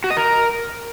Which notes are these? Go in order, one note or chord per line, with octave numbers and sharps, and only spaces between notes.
F#4
D#5
A#4